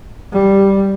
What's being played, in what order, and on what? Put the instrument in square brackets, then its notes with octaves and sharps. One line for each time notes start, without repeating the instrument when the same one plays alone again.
[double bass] G3